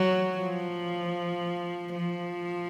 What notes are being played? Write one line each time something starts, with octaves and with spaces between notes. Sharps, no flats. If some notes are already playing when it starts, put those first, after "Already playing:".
Already playing: F#3
F3
F3